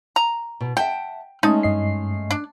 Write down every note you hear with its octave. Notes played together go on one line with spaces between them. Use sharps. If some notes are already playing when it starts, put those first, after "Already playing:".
A#5
B2
E5 F#5 G5 A5
G#3 A3 C#4 D#4 D#5 A5
G2 D#5 C7
D4